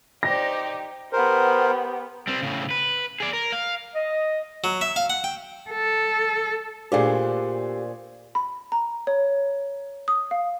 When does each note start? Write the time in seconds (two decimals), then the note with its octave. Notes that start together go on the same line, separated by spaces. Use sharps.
0.23 D#4 G4 C5 D5 A#6
1.13 B3 G4 A#4 C5
2.28 G3 C4
2.42 A2 C#3
2.71 B4
3.20 G#4 D5
3.33 A#4
3.52 F5
3.94 D#5
4.64 F#3
4.81 E5
4.96 F5
5.10 F#5
5.24 G5
5.70 A4
6.92 A#2 A3 D4 G4 G#4 C5 F5
8.35 B5
8.72 A#5
9.07 C#5
10.08 D#6
10.31 F5